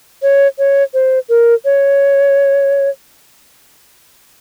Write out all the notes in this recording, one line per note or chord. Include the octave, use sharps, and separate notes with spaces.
C#5
C#5
C5
A#4
C#5